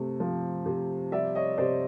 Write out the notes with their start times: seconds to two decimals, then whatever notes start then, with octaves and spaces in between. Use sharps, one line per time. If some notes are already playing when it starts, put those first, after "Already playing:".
Already playing: C3 A3
0.20 F3
0.66 C3
1.12 G3 D5 E5
1.35 C#5 D#5
1.58 C3 C5 D5